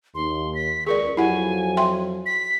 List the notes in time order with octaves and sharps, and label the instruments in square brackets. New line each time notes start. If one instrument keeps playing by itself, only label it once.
[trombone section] D#2 [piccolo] C6
[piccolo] B6
[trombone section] C#2 [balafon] G#4 A#4 D5 [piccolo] C#6
[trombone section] F2 F#3 [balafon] E4 G4 F#5 [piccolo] G#5
[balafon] E5 G5 C6
[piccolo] B6